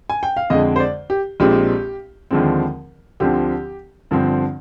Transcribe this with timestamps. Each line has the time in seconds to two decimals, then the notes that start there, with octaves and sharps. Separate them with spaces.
0.10 G#5
0.23 G5
0.37 F5
0.50 F2 D3 G#3 D#5
0.76 C5
0.80 D5
1.10 G4
1.40 A#1 A#2 G#3 C4 G4
2.31 D#2 D3 F3 G#3 C4
3.20 D2 D3 F3 C4 G4
4.11 G1 G2 D3 F3 C4